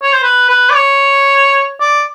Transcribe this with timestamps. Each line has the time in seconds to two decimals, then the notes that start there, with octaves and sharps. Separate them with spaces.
0.02 C#5
0.13 C5
0.23 B4
0.49 B4
0.70 D5
0.75 C#5
1.80 D5